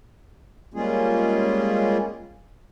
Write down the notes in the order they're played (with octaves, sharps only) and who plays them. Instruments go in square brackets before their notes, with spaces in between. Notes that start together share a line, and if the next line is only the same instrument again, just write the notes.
[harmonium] G3 G#3 A#3 C#4 F4 G#4